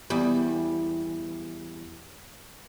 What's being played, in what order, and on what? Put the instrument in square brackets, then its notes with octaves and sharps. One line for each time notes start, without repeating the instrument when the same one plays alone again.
[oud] E2 G3